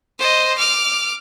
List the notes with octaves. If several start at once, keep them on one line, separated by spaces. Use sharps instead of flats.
C5 D#5
D6 F6